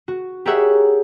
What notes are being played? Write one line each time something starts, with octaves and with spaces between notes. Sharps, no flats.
F#4
G4 G#4 A#4 C#5 E5 F#5